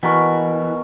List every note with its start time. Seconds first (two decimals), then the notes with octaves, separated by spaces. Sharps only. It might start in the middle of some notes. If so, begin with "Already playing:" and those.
0.03 B2 E3 A#4 C#6